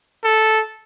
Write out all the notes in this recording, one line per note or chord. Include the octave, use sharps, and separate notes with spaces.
A4